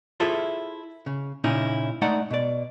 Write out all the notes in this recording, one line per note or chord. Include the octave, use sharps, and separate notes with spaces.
E4 F4 G#4 A4 C5 E5
C#3
A#2 C#3 C#4 D#4 E4
G#3 A3 D#4 D5 F#5
B2 D5